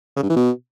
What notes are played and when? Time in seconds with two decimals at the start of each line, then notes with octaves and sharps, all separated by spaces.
0.17 C#3
0.23 G2
0.30 E3
0.37 B2